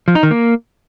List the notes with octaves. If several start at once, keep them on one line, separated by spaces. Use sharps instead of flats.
F3
D#4
D#3
A#3